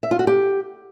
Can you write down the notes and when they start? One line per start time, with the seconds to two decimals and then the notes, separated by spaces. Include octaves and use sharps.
0.03 E5
0.11 F4
0.19 F#4
0.27 G4